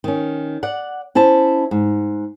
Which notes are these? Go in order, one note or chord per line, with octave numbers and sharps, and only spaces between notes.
D#3 C#4
D5 F#5
C#4 E4 C5 A5
G#2